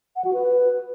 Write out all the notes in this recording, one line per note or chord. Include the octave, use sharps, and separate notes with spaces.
F#5
F#4
B4